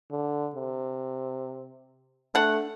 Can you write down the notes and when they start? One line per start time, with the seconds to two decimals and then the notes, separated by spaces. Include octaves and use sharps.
0.12 D3
0.56 C3
2.35 A3 D4 F#5